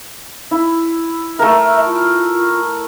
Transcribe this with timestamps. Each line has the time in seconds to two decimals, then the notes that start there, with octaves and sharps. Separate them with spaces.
0.51 E4
1.39 A3 A#4 E5
1.86 F4